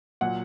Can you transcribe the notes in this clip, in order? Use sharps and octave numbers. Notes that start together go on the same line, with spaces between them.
A#2 F#3 F#5